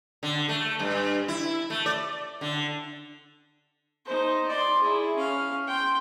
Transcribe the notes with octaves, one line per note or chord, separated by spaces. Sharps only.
D3
A3
G2
E4
A3
D5
D3
D#4 C5
D5 C6
E4 G#4
C#4 F5
G5 C6